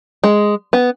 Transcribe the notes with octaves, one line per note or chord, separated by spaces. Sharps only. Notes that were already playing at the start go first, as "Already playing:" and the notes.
G#3
B3